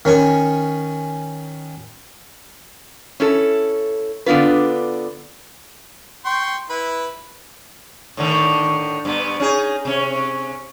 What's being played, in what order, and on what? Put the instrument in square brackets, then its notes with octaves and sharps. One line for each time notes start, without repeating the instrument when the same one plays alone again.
[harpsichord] D#3 C#4 G#5 C#6
[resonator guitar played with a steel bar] C#4 E4 A4
D3 B3 D4 F4 B4
[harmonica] G5 C6 C#6
E4 B4
[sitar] A2 D3 D#3
G2 B3
C#4 D#4 G#4
C3 C#4